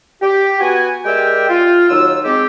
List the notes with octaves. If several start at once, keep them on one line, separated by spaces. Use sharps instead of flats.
G4
B3 F#4 F#5 G#5
G#3 G4 A#4 D5 E5 G5
F4
D#2 F#3 D#4 E6
G#3 C4 G4